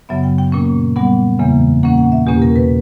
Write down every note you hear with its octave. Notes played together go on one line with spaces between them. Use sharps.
F#2 C#3 F#3 B3 E5
G5
G5
A#2 A#3 C#4
A#2 G3 B3 F#5
E2 C#3 E3 A#3
A#2 A#3 C#4 F#5
F#5
E5
E2 B2 A#3 C#4 G4
A#4
B4